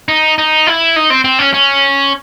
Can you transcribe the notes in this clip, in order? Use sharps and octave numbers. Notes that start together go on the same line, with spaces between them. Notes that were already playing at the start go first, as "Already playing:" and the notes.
D#4
D#4
E4
D#4
C4
C4
C#4
C#4